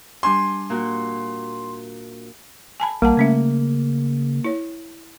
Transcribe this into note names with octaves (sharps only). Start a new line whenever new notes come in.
G3 D4 G#5 C6
A#2 A#3 F#4
G#5 A5 B5
A#1 G3 A#3 F#5 A5
C#3 A3 C#4 E5
E4 C#5